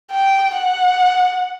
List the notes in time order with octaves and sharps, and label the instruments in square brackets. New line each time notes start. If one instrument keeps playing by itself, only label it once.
[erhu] G5
F#5